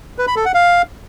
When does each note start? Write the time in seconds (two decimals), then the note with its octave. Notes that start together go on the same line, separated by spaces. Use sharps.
0.18 B4
0.27 B5
0.36 A4
0.45 F#5
0.54 F5